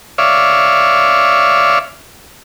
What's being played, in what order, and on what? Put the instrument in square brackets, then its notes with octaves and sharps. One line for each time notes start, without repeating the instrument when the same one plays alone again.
[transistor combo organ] C#5 D5 E5 F5